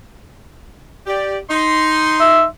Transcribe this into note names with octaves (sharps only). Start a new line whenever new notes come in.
G4 D5
D#4 C6
E5